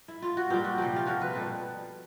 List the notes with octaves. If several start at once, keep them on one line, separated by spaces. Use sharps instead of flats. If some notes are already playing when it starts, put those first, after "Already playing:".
E4
F4
F#4
A#2 G3 G4
F#4
C3 F3 G4
F4
A#2 F3 F#4
B4
B2 G3 A4